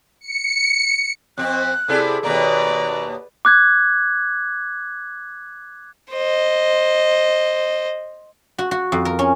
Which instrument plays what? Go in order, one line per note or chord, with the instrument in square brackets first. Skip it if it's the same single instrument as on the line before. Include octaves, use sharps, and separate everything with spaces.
[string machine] C#7
[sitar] F2 C4 [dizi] F#6
[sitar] C3 E4 D5 [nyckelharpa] G#4 A4
[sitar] D#2 B2 A#3 [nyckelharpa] B4 D5 [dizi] A#5
[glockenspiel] D6 F#6 G#6
[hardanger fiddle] C5 D#5
[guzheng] F#4
F#4
F2
A#4
C#4